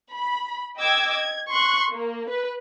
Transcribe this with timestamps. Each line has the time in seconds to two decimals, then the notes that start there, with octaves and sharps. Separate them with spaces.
0.13 B5
0.77 D#5 G5 D6 E6 G#6
1.13 G#6
1.49 C6 C#6 F#6
1.90 A#3
2.29 B4